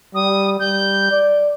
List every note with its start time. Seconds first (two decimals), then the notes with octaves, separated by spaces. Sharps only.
0.15 G3 D#6
0.60 G3 G6
1.11 D5